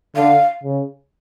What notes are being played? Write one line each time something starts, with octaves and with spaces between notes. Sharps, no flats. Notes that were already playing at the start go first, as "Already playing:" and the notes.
D3 F5
C#3